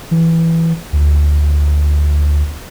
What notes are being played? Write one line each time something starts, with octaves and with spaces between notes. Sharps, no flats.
E3
D2